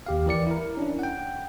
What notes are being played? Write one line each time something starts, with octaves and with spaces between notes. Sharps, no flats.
D#2 G4 F5
E3 A#4 D5 C#7
E4 A#4
C#4 D4 E4
F#5 G5